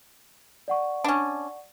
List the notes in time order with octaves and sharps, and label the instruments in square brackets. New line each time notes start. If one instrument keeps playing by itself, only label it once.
[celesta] D5 F#5 C#6
[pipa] C#4 D4